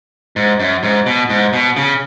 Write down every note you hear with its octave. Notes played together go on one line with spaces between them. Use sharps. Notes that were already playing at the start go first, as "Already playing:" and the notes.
G#2
F#2
G#2
B2
G#2
B2
C#3